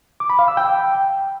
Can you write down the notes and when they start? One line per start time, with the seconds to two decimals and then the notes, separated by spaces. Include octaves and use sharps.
0.20 D6
0.30 B5
0.39 F5
0.48 E6
0.57 G5